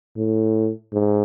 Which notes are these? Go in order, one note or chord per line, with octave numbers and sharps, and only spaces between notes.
A2
G#2